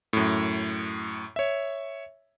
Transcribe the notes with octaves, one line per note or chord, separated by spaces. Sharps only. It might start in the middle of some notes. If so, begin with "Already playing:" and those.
F#2 A2
C#5 E5